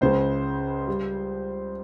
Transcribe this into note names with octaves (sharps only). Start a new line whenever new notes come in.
C#2 C#3 G#3 C5
G3